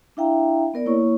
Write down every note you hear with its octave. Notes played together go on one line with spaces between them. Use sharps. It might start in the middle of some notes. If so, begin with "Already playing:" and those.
D4 E4 E5 F5 G5 A#5
B3 A#4 D5
A#3 E4 C#5 C#6